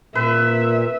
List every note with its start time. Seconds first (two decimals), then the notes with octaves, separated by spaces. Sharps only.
0.15 A#2 B4 E5